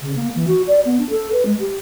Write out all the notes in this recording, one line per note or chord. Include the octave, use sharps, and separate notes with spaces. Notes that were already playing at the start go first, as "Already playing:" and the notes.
C#3
A#3
E3
F#4
D5
B3
D4
A4
B4
G#3
G4